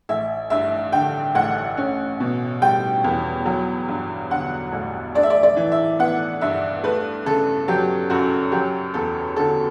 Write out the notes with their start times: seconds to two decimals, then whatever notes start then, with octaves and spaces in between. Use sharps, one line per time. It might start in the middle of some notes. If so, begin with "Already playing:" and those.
0.09 A1 E5
0.50 G2 E5
0.92 D3 G5
1.35 A1 F#5
1.77 C#4
2.20 B2
2.62 G3 G5
3.04 E2
3.46 F#3
3.88 G2
4.31 D3 F#5
4.72 A1
5.15 D4 D5
5.23 E5
5.30 D5
5.43 D5
5.56 E3
5.72 E5
5.99 B3 F#5
6.41 G2 E5
6.83 A3 B4
7.26 C#3 A4
7.68 F#3 G4
8.10 F#2 F#4
8.52 F#3 G4
8.94 E2 A4
9.36 D3 A4